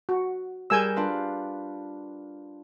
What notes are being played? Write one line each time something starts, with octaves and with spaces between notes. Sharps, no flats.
F#4
G3 G#4 A#4 G#5 E6 G6
D4 F4 B4